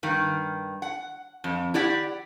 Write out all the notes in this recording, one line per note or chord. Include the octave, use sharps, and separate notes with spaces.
G2 D#3
F#5
F2
E4 G4 D5 F#5